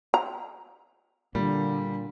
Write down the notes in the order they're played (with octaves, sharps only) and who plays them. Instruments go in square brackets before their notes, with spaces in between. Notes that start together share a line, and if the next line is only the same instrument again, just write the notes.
[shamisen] A#5
[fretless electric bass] A#2 [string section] D3 [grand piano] G3